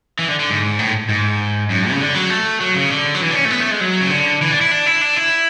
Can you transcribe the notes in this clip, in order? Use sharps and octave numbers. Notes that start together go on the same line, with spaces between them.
E3
D3
D3
G#2
A2
G#2
F#2
C#3
D3
F#3
A3
F#3
C#3
D3
F#3
E3
D4
C#4
A3
B3
A3
G#3
F#3
C#3
D3
E3
D4
E4
D4
E4
D4
E4